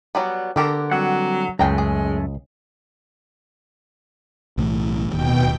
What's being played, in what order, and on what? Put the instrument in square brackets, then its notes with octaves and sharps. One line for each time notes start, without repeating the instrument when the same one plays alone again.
[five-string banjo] F#3 G3 B3
[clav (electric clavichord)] D3 A5 [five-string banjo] B3 G4 A#4
[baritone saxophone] F#3 [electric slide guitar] G3 C4 F#5
[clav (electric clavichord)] C#2 [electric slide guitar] F#2 A3 [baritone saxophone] G#3 [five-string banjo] G#4 G5 A#5
[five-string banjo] G#4
[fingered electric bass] B1 A2 E3
[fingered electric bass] D1 D#2 [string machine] B2 G5